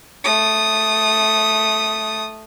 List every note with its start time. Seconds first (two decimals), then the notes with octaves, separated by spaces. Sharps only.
0.24 A3 D#6